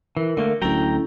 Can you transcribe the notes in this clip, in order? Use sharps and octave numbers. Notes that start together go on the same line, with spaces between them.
E3 A#4
D3 A3 A#3 A#4
D2 F#3 C#4 E4 A4 G5 A#5